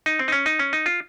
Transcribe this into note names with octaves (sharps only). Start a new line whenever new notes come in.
D#4
C4
D#4
C#4
D#4
C#4
D#4
F4